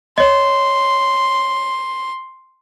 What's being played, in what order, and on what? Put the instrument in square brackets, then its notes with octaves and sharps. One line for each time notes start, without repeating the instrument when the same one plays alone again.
[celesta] C#5 D#5 [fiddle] C6